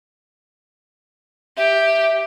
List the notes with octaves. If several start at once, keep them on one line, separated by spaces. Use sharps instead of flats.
G4 E5